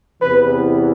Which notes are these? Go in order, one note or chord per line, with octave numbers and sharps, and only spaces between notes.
E2 C3 E3 B4